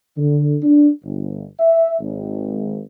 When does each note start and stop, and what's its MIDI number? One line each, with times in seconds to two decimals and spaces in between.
0.18 0.57 50
0.63 0.90 62
1.04 1.45 31
1.60 1.95 76
2.00 2.80 32